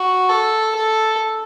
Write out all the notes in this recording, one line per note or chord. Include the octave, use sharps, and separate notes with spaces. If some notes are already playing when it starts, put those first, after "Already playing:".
Already playing: F#4
A4
A4